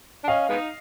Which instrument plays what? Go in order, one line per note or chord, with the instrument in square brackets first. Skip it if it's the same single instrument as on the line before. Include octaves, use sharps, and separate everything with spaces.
[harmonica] D4
[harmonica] C#4 [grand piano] D#5 F5
[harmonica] G#3 B3 D#4